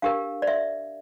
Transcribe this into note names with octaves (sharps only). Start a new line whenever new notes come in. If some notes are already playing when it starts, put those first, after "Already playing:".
D4 G4 A#4 F5
D5
E5